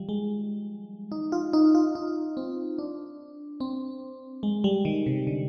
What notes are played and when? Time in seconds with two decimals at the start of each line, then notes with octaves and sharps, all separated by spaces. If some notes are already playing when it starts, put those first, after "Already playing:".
Already playing: D#3 F3 G3
0.09 G#3
1.12 D#4
1.32 F4
1.53 D#4
1.75 F4
1.95 D#4
2.37 C4
2.78 D4
3.60 C4
4.43 G#3
4.64 G3
4.85 D#3
5.06 C3
5.27 D3